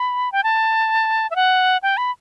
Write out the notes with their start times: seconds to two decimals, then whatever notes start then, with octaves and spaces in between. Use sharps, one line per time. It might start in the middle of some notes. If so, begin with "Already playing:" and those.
Already playing: B5
0.32 G5
0.44 A5
1.31 E5
1.36 F#5
1.83 G5
1.97 B5